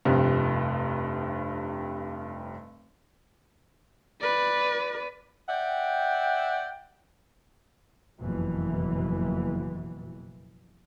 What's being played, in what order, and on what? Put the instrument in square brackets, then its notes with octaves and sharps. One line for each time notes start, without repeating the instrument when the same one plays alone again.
[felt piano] F1 G2 C3 F3 G3
[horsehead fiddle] B4 D5
[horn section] D5 E5 F#5 G5
[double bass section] F#1 F2 B2 E3